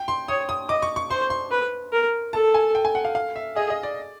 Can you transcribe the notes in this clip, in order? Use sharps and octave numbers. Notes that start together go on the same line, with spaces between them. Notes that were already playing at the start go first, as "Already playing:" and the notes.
Already playing: G5
C6
C#5 D#6
D#6
D#5 D6
C#6
C#6
C5 C6
C6
B4
A#4
A4 A5
G#5
G5
G#5
F#5
F5
F5
E5
G#4 D#5
D#5
D5